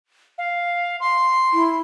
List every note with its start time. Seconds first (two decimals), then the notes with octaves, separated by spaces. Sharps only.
0.38 F5
1.00 C6
1.53 E4